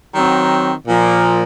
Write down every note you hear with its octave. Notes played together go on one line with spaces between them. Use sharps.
D#3 F#3 C4 F#4
A#2 F3 A#3